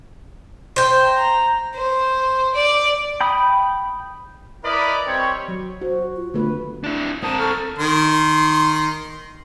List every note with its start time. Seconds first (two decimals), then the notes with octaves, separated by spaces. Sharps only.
0.76 C5 G5
1.06 A#5
1.75 C5
2.55 D5
3.21 G5 B5 D#6
4.64 E4 A#4 B4 D5 D#5 B5
5.06 G3 C4 G4 C#5
5.48 F#3
5.82 F#4 C5
6.17 F4
6.34 D3 A3 B3 B4
6.84 D4 E4
7.23 C4 A#4 A5 D#6
7.38 A4 C#6 F6
7.79 D#3 C6